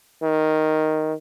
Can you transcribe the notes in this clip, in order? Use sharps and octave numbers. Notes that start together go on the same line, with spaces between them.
D#3